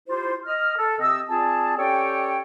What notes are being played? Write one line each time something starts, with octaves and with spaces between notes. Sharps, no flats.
E4 F4 G4 C5
D#5 F6
A4
C3 C4 D#5 E6
C4 F4 G#4 D5 G#5 A5
C#4 G4 A4 C#5 D5 G5